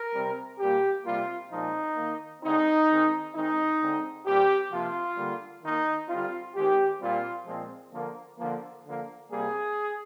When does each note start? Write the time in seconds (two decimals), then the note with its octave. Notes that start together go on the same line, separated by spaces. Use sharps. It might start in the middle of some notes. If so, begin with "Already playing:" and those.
Already playing: A#4
0.14 C3 G3 C4
0.59 A#2 G3 A#3 G4
1.04 C3 G3 A#3 F4
1.50 A#2 F3 G#3 C4 D#4
1.96 D#3 A#3
2.42 D3 G#3 C4 D#4
2.88 D#3 G#3 C4
3.34 D#3 G#3 C4 D#4
3.80 D3 G#3 C4
4.25 A#2 G3 C4 G4
4.71 C3 F3 A#3 F4
5.17 D3 G3 A#3
5.63 D#3 A#3 D#4
6.09 D3 G3 C4 F4
6.54 D#3 G#3 C4 G4
7.00 A#2 G3 C4 F4
7.46 A#2 F3 G#3 C4
7.92 D3 F3 A#3
8.38 D3 F3 A#3
8.84 D3 F3 A#3
9.30 C3 G3 A#3 G#4